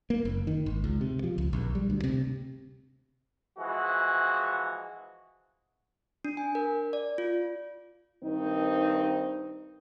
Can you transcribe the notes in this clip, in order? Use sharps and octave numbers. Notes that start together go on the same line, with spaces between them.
A#3
F#1
D#3
G#1
C#2
C3
F3
C#2
A#1
G3
D2
C3
E3 F3 G#3 F#4
D4
G#5
A#4
D5
F4
G2 D#3 C4 D#4